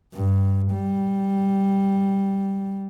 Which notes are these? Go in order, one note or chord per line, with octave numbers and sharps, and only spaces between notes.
G2
G3